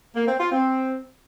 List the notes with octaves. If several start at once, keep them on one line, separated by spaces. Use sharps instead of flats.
A#3
C4
F4
C4